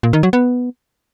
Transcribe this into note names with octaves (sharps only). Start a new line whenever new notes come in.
A#2
D#3
F#3
B3